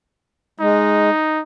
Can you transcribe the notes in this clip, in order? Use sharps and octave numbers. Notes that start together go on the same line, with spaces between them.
G#3 D#4